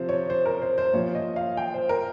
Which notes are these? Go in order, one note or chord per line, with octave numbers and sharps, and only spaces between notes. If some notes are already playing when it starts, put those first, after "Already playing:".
Already playing: C3 F3 C5
C#5
C5
A#4
C5
C5
A#2 F3 C#5
D#5
F5
G5
C5
A#4